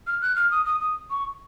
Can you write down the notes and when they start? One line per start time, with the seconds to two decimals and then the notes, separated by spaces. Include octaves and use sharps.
0.07 F6
0.21 F#6
0.35 F6
0.51 D#6
0.65 D#6
0.80 D#6
1.10 C#6